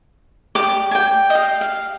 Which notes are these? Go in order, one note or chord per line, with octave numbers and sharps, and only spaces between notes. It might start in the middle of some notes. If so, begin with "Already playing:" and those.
G4 D5 D6
G#5
G5
D#5
F5
F5